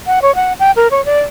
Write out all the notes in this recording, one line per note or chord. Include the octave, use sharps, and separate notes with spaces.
F#5
C#5
F#5
G5
A#4
C#5
D5